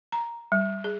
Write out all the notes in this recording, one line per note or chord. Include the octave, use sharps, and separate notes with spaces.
A#5
G3
G#4